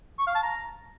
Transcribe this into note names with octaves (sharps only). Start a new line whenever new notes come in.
C#6
F5
A5
A#5